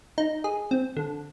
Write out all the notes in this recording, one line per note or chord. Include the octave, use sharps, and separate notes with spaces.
D#4
G#4
C4
D3